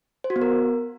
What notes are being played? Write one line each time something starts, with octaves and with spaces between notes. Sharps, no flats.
C5
F#4
B3
A#4